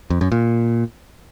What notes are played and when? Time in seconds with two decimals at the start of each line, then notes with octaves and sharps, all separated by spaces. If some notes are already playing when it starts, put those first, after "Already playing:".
0.10 F2
0.21 F#2
0.32 A#2